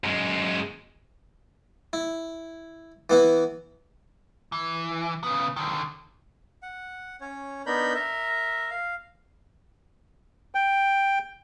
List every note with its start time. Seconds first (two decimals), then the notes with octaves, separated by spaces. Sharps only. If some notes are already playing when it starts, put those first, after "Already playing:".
0.04 F#2 G#3
1.93 E4
3.10 E3 B3 E4
4.52 E3
5.23 C#3 B3
5.56 D3 D#3
6.63 F#5
7.21 C#4 C#5
7.66 B3 D4 D#4 A#4 B5 G6
7.94 A#4 E5
8.71 F5
10.55 G5